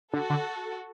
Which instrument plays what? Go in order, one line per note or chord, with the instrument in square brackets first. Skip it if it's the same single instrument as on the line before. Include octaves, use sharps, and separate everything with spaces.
[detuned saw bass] D3 [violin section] F#4 A4
[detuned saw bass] D3